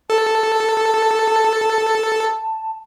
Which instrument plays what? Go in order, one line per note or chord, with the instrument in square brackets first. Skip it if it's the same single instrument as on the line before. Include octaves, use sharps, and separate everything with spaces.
[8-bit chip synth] A4 [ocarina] A5